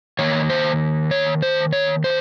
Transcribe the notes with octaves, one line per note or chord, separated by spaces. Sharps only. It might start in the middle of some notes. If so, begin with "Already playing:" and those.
D#3 A#3 C#5
C5
C#5
C5
C#5
C5